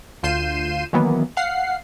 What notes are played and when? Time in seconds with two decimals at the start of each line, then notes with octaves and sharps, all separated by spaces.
0.23 D2 F4 G6 C7 D#7 E7
0.93 D#3 E3 F#3 A#3 B3
1.37 F5 F#5 C7